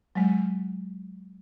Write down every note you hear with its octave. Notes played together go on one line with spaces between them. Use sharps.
F#3 G#3